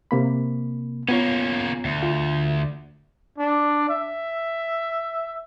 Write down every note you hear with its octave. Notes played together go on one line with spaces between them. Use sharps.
C3 A#3 B5
A#3 B3 C#4 F4 C#5
D2
F4
D4
E5